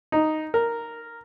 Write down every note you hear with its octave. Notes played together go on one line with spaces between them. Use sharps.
D#4
A#4